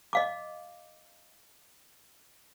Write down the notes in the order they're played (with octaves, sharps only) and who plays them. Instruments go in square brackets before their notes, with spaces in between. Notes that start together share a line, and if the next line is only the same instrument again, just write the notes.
[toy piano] D#5 F5 D6